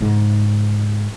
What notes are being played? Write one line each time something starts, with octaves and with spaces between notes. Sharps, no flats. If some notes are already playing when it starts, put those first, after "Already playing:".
G#2 C#3